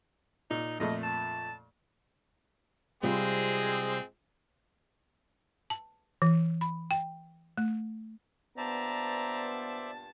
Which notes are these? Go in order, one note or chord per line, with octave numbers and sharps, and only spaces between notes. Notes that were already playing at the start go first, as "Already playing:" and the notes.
A#2 D#4
F2 A#2 A3 D#5
A5
C3 G3 G#3 C4 F4 G#4
A5
E3
B5
G5
A3
G2 A#2 B3 C5 D5 E5 A5 A#5